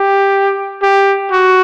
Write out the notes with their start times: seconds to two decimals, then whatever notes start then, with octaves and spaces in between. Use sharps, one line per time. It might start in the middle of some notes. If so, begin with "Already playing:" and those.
Already playing: G4
0.83 G4
1.31 F#4